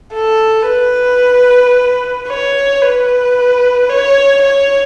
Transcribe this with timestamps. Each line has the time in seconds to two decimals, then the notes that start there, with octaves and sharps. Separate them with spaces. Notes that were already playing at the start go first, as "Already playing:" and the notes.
0.14 A4
0.68 B4
2.28 C#5
2.82 B4
3.89 C#5
4.42 C#5